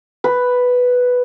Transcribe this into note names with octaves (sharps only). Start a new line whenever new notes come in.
B4